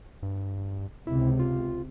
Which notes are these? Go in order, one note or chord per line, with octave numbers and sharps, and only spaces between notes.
G2
C#2 C3 E4
F4